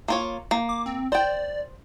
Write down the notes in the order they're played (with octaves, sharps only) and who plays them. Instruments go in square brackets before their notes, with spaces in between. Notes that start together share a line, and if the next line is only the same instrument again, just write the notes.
[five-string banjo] A#3 F4 C#5
A#3
[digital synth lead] D6
C4
[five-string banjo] C5 G5 [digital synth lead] D5